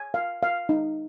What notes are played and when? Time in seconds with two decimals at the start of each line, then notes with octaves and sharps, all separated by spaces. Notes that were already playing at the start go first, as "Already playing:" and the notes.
Already playing: G#5
0.14 F5
0.43 F5
0.69 D#4